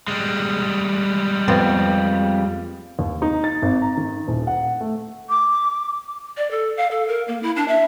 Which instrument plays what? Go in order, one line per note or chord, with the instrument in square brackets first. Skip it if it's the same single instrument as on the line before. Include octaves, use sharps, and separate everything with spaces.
[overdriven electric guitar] G3 G#3
[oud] F2 B3 C4
[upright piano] D#2
D#4
A6
G#1
A#5
D#3
D#1
F#5
A3
[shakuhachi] D6
[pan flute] D5
A4
F5
A4
A#4
A#3
E4
D4
E5